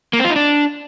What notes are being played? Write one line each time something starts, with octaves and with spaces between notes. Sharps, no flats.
A#3
C4
F4
D#4
D4